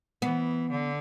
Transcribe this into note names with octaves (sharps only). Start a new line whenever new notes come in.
E3 B3
D3